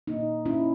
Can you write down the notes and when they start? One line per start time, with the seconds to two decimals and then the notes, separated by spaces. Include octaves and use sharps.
0.07 A#2 A#3 D#4
0.46 C#4 E4